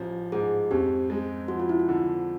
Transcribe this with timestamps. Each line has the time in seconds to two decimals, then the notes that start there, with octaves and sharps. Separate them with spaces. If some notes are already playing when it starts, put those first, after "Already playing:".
Already playing: A1 F3
0.32 G#2 G#4
0.71 F2 G4
1.10 G#3
1.48 F3 F#4
1.59 F4
1.69 E4
1.80 F4
1.88 D3